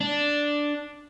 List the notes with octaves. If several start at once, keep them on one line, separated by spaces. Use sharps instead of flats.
D4